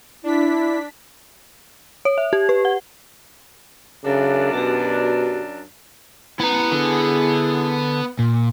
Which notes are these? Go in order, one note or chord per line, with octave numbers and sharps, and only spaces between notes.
D4 E4 B6
C#5
E5
G4
B4
F#5
F#2 C#3 D4 A4 E5
B2 F#4 G4
B3 E4 A#5
D3 E4 G#4
A#2